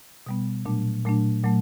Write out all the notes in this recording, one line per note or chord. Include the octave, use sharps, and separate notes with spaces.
B2 G3 B3
A#2 F#3 A3 D4
A#2 F#3 A3 D4
A#2 F#3 A3